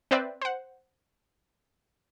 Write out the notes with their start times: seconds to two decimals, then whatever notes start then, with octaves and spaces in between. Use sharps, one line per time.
0.11 C4 B4 C5 D5 E5
0.41 C5 F#5